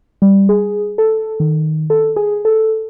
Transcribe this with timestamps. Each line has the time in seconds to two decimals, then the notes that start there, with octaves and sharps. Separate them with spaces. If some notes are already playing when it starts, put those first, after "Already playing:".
0.22 G3
0.49 G#4
0.98 A4
1.40 D#3
1.90 A4
2.16 G#4
2.45 A4